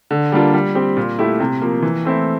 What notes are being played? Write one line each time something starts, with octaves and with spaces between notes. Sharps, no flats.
D3
G3 A#3 D4 F4
G3
C4 G4
A#2
A3 E4 G4
C3
F3 A#3
E3
A3 C4 E4